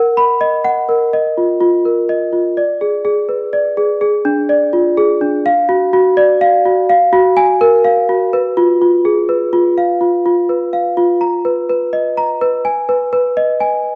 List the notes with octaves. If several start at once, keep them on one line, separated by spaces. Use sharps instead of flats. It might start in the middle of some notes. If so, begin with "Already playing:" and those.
Already playing: A#4 F#5
B5
D#5
F#5
A#4
D#5
F4
F4
A#4
D#5
F4
D5
G#4
G#4
B4
D5
G#4
G#4
D4
D5
F4
G#4
D4
F5
F#4
F#4
D5
F5
F#4
F5
F#4
G#5
A#4
F5
F#4
B4
F4
F4
G#4
B4
F4
F5
F4
F4
B4
F5
F4
A#5
B4
B4
D#5
A#5
B4
G#5
B4
B4
D#5
G#5